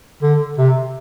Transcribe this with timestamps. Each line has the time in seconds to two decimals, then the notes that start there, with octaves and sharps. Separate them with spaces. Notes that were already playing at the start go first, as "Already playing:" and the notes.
0.23 D3
0.58 C3